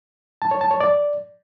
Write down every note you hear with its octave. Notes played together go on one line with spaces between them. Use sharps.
A5
C#5
A5
C#5
D5